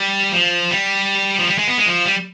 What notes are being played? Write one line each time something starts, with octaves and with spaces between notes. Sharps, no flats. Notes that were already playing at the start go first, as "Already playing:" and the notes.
Already playing: G3
F3
G3
F3
G3
G#3
B3
G#3
F3
G3